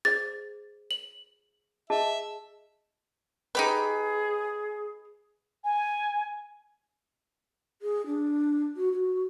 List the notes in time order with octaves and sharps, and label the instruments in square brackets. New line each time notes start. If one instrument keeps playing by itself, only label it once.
[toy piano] G#4 C5 D5 [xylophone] A6
[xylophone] F#7
[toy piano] G#4 D#5 A5 [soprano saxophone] E5
[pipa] D#4 G4 B4 [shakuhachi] G#4
[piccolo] G#5
[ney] G#4
D4
F#4
F#4